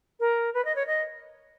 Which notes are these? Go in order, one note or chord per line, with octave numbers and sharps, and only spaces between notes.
A#4
B4
D#5
C#5
D#5